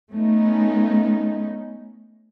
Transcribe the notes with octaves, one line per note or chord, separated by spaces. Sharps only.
A3 B3 C#4 D#4